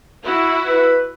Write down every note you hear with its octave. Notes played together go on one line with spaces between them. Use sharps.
E4 F#4
B4